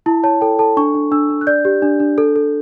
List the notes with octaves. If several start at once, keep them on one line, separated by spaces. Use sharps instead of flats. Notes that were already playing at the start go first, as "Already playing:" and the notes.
E4 A5
C#5 A5
A4 G5
A4 A5
D4 C#6
D4
D4 E6
D4
F#6
D5 G6
G4
D4
D4
A4
A4